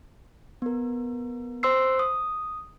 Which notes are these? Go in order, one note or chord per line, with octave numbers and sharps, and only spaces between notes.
B3 A#4
C5 C6 E6 C7
D#6